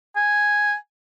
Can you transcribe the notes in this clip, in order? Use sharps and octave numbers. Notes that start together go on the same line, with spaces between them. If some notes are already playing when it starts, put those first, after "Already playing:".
G#5